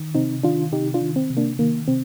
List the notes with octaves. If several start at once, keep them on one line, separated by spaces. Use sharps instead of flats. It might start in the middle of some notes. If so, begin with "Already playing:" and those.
Already playing: D#3
C3 C4 D#4
D#3 D4 F4
C3 D#4 G4
D4 F4
D#3
C4
C3
A#3 D4
D#3 A#3
C3 C4